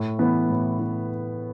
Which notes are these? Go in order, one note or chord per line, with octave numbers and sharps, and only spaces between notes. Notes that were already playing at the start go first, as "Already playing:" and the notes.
Already playing: A2
E3 B3
A2
E3